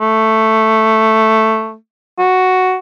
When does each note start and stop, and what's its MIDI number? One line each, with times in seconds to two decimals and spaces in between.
0.01 1.75 57
2.18 2.76 66